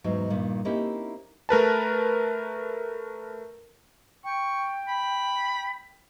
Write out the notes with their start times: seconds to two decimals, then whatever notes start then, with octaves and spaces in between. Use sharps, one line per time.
0.04 E2 G#2 F#3 D#4
0.30 G2 A#2 D#3
0.65 A#3 C4 C#4 D#4 E4 G4
1.49 A3 A#4 B4 A5
4.25 G5 C#6
4.88 B5